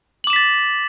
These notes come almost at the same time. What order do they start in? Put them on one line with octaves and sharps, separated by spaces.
F#7 D6 E7 B6 A6